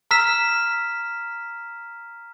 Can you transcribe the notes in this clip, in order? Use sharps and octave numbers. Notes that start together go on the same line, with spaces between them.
A#5 E6 F6 B6 E7